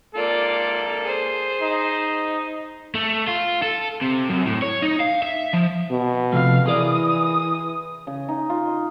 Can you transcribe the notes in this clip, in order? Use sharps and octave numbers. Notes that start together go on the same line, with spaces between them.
A#3 F4 A4 D5
G#4 C5
D#4
A3
F4
A4
C3
F#2
A2
C#5
D#4
F5
E5
F3
B2
C3 F3 A3 F5
E3 G#4 A#4 D5 D#6
C#3
D#4
F4
D#5